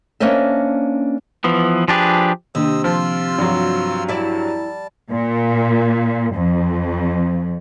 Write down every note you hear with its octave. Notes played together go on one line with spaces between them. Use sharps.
A#3 C#4 D4 C5 D#5 E5
E3 F3 B3
F3 D4 G4 G#4 B4
C3 D#3 A#3 D4 D#5 E6
F3 F4 C5 A5 C6 E6
G2 F3 F#3 F#4
G3 E4 D5 A5
A#2
F2